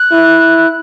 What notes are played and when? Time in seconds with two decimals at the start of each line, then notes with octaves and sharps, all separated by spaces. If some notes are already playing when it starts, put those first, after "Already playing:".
Already playing: F#6
0.12 E4